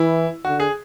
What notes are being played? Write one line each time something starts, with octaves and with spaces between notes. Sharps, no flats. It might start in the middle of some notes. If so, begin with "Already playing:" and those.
Already playing: E3 E4
D3 F#4
G#4